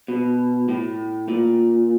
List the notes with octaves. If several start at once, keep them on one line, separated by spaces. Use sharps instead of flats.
B2
A2
A#2